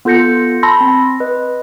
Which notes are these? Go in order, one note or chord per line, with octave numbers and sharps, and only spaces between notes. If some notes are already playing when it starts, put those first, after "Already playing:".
B3 F4 A4 G6 A#6 C#7
A5 B5 C6 E6 A#6
C4
B4 D#5